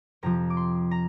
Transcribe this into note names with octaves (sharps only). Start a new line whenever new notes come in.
F2 C3 F3 A#5
D6
C6
A#5